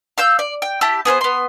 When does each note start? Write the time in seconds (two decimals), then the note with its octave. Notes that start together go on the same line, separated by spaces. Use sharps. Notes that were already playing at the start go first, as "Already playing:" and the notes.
0.18 F5 E6 G6
0.39 D5
0.62 G5
0.81 E4 G4 A5
1.05 B3 G#4 A#4 C5
1.21 B3 C6